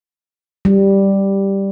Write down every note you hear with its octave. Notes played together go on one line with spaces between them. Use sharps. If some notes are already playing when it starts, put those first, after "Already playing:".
G3